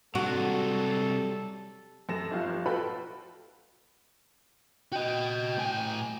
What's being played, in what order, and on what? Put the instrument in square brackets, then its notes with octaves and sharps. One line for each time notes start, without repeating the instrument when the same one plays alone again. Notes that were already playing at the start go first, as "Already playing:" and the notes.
[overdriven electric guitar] C3 F#3 [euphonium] G3 [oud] F#4 [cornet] A4
[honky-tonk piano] F#2 A4 A#6 E7
G1 F3 G4 F5
F4 F#4 A4 B4 G5 B5
[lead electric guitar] F#4 D#5 [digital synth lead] G5
[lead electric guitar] A2 G#5